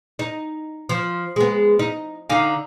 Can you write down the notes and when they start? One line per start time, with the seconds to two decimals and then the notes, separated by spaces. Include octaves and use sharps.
0.19 D#4
0.89 F3
1.36 G#3 B3
1.79 D#4
2.30 D3 D#4 F5